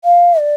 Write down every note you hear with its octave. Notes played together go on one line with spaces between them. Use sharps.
F5
D5